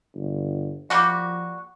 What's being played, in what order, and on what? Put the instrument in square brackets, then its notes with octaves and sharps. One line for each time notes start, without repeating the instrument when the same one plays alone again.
[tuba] G1
[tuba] F3 [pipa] G3 A#3 F#4